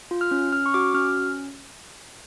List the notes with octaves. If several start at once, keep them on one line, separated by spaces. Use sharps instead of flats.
F4
F6
C#4
C#4 F6
C#6
F#4 D6
C#4 F6